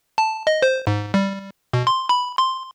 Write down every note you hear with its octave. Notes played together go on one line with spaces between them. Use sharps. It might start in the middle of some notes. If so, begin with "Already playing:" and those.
A5
D#5
C5
G#2
G3
B2
C6
B5
C6